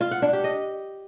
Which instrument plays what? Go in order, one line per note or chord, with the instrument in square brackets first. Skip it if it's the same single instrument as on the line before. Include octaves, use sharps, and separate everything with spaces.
[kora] F4
F#5
D4
G4
D#5